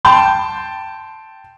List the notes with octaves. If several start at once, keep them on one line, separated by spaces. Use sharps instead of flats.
G5 A5 C6 G6